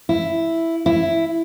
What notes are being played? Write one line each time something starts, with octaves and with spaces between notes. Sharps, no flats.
E4
E4